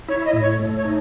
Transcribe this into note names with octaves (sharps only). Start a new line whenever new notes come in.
E4 C#5
D#5
A2
C#5
A3
C#5
D#4